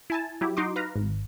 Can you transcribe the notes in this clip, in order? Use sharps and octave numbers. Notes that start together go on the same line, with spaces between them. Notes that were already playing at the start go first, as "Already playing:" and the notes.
E4 G#5 A5
F#3 E4 G4
D#4 F#4 C6 D6
B4 F5 A#5
G#1